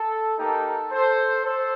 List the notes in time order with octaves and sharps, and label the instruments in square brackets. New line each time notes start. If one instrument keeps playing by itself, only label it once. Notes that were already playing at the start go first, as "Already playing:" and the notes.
Already playing: [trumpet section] A4
A#3 D#4 G4 A4
A4 C5
A4 C5